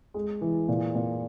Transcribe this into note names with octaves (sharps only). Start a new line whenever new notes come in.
G#3
E3
A#2
A#2